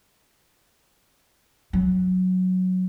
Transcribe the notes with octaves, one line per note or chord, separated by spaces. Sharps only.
F#3